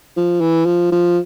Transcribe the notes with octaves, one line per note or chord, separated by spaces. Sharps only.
F3
E3
F3
F3